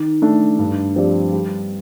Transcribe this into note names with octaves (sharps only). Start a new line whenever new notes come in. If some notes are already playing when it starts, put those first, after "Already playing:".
Already playing: D#3
A3 D4
G2
F3 C4 G4 D5
G3